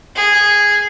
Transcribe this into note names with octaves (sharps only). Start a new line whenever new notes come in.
G#4